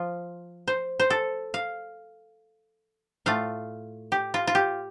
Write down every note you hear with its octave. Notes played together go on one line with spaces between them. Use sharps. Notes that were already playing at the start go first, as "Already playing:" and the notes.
Already playing: F3 F4
C5
C5
A4
F5
A2 A3 F4 F5
G4
F4
F4
G4